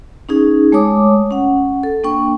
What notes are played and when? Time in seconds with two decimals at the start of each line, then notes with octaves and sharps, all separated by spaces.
0.29 C#4 D#4 G#4
0.72 G#3 A3 C#5 D6 D#6
1.31 C#4 F#5
1.83 A4
2.04 A#3 D4 G5 C#6